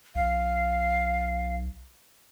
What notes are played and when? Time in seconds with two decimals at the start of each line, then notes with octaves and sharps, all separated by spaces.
0.15 B1 F5